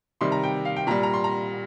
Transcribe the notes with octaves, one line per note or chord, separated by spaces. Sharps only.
C3 D#3 G3 C6
A#5
G5
F5
G5
A#2 G3 A#5
A#5
C6
A#5